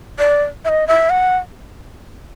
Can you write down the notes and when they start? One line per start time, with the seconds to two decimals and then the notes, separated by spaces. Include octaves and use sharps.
0.19 D5
0.65 E5
0.69 D#5
0.87 E5
1.10 F#5